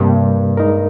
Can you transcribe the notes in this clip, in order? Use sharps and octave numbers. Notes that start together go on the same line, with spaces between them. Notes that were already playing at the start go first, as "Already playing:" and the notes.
Already playing: G2 C3 G3 A#3
G#3 D#4 A#4